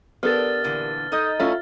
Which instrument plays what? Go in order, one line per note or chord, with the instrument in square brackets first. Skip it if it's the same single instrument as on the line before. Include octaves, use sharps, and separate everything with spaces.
[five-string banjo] B3 A4 [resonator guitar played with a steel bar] D4 [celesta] G4 A#4 [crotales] F6 A6
[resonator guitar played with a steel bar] A#2 D3 E3
[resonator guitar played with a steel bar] D#4 D#5 [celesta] A4 D#6 G6
[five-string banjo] A3 C#4 E4 [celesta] F4 E5 F5